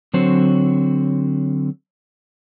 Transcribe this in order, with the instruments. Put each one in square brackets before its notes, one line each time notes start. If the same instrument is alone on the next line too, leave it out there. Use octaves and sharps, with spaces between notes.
[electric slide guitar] D3 F#3 C4 F#4 C5 C#5